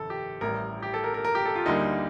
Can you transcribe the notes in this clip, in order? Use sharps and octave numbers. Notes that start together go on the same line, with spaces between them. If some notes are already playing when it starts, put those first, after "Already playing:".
Already playing: G1 F2 C3 D#3 A4
G4
A1 A2 G3 A#4
G4
A4
A#4
A#4
A#4
G4
A4
F4
D2 D3 G3 A#3 D#4